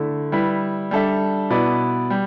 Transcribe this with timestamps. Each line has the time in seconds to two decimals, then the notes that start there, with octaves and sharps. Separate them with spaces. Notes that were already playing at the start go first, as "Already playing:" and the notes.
Already playing: D3 A3 E4
0.32 G3 E4 B4 E5
0.91 G3 D4 A4 E5
1.50 B2 B3 E4 B4 D5
2.10 G3